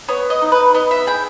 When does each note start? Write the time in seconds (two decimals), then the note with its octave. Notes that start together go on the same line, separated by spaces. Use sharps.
0.08 B3 C#5
0.30 D#5
0.42 D#4
0.52 B4
0.74 B3 D#5
0.91 E5
1.07 G#4 G5